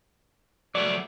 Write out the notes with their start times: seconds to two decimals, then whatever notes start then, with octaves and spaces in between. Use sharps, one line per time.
0.75 F#3 A3 D5